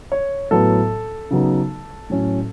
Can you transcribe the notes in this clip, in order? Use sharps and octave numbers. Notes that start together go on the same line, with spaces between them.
C#5
A2 F#3 B3 A4
C#3 F#3 B3 D#4
A2 F#3 C#4